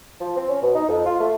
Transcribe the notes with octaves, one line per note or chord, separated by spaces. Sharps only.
F3
C4
C#4
B2
D#4
F2
F4
A3